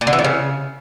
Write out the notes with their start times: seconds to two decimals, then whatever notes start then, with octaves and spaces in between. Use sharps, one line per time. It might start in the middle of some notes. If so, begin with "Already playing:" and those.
0.01 A#2
0.07 D3
0.13 E3
0.19 A2
0.24 C#3